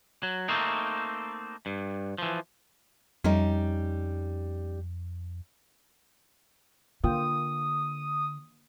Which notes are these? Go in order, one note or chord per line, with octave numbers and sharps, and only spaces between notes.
F#3
A3 A#3 C4 D#4
G2
E3 F3
F2 G3 C#4 D#4
D3 A#3 F4 G5 D#6